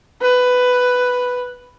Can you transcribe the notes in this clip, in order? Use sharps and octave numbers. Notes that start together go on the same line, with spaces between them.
B4